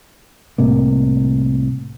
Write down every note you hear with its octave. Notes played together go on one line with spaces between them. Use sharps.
C2 A2 C3 A#3